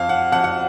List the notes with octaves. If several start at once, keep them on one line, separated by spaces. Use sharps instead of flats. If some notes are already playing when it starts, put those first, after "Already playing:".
Already playing: F2 F5
F#5
F2 F#5
F#5